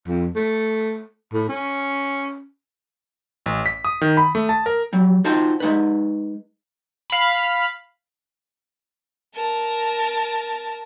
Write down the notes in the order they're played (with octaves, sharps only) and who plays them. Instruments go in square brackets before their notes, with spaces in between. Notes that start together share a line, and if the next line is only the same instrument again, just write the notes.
[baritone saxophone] F2
A3
A2
C#4
[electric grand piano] A1
B6
D#6
D#3
B5
A3
A5
A#4
[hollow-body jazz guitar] F#3 G3
D#4 F4 F#4 C5 G5 A5
G#3 D#4 B4
[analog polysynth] F5 B5
[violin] A#4 A5